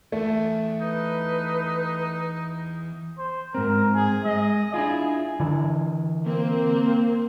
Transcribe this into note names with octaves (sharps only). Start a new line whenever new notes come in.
E2 A3
D#4 B4
C5
G#2 C4 A#4
G#4
G#3 D#5
D4 E4 F4 G#4
D3 E3
A#3 C4